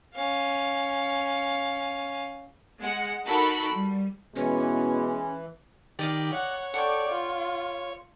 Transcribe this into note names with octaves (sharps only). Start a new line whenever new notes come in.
C#4 F5
G#3 F#5
D#4 F#4 A4 A#4 B5
G3
B2 E3 G#3 C#4
D#3 G4 D5 D#5 F5
C#5 F#5
A4 D5 F#5 G5 C#6
F4